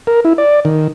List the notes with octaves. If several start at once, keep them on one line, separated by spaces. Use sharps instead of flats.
A#4
E4
D5
D#3